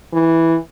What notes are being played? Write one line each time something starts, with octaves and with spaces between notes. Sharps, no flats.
E3